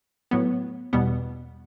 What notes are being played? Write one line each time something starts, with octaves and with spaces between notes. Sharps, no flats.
A2 F#3 B3
E2 B2 G3 B3